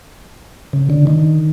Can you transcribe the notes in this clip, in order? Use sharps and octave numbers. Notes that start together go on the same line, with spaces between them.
C#3
D3
D#3